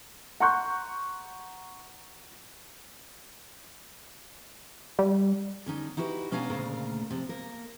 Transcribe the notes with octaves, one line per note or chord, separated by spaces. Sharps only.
F#5 A#5 C6 C#6 F#6 G6
G3
D3 C#4 D#4
D#4 E4 F#4 G4 B4
B2 C#4 D4 F5 G#5 A#5
D2 A#2 C#3 A3 A#4 F5
C3 F3
A#3 A#4